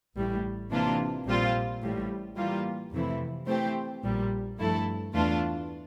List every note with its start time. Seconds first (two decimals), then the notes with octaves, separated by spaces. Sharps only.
0.16 A1 A2 G3
0.71 C3 E3 A#3 D4 F4
1.26 A#1 A#2 G3 C4 F4
1.82 A1 A2 G3
2.37 E3 G3 A#3 F4
2.92 F2 C3 E3 A3 E4
3.47 E3 A3 C4 G4 C5
4.03 A#1 A#2 G3
4.58 G2 F3 A3 E4 A4
5.13 E2 E3 A3 D4 F4